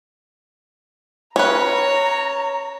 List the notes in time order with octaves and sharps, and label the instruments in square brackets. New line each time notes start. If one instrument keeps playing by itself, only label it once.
[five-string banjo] C#4 B4 [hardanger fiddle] C#5 [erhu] A#5